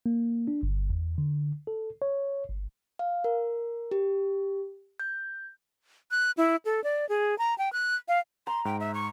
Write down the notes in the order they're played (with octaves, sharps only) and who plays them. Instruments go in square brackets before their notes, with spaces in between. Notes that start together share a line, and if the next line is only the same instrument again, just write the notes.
[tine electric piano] A#3
D4
G1
E2
D3
A4
C#5
G1
[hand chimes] F5
A#4
G4
G6
[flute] F#6
E4
A4
D5
G#4
A#5
G5
F#6
F5
[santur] A#5 [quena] C6
[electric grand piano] G#2 [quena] G5
[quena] E5
C#6